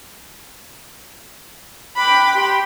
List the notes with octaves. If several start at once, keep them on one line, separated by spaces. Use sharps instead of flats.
G5 B5 D6 F#6
G4 G5 C6